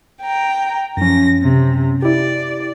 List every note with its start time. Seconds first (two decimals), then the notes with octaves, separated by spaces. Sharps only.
0.21 G5 A#5
0.97 F#2 F3 C#4 A#6
1.42 C3
2.02 E4 G4 D5